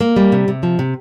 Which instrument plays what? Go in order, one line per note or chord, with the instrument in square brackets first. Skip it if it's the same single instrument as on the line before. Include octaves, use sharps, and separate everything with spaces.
[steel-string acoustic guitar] A#3
G3
C3
C3
F3
C3